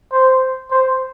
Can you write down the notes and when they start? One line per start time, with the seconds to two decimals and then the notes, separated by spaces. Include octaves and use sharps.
0.12 C5
0.71 C5